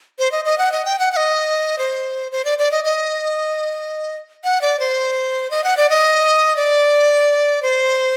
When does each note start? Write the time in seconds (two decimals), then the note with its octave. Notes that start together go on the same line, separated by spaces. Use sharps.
0.19 C5
0.32 D#5
0.45 D#5
0.58 F#5
0.72 D#5
0.85 G5
0.99 F#5
1.12 F#5
1.16 D#5
1.79 C5
2.32 C5
2.45 D5
2.59 D5
2.71 D#5
2.84 D#5
4.44 F#5
4.61 D5
4.80 C5
5.51 D#5
5.64 F#5
5.77 D5
5.90 D#5
6.56 D5
7.62 C5